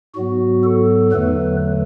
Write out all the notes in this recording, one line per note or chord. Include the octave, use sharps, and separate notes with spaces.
G#2 F#3 B3 F#4
A4
E2 D3 F#3 A3 B4